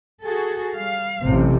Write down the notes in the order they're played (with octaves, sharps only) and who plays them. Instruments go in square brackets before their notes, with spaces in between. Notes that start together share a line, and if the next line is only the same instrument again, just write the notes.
[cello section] F#4 G#4 A4
G3 F5
[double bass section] A1 C3 [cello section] F#2